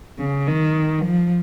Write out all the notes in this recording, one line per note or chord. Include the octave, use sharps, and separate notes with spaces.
C#3
D#3
F3